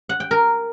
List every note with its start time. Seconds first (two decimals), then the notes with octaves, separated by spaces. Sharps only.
0.09 F#5
0.20 G5
0.31 A#4